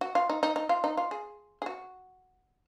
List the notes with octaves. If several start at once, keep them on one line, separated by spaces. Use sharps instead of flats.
F#4
F4
D#4
D#4
D#4
F4
D#4
F4
G#4
G#4
F#4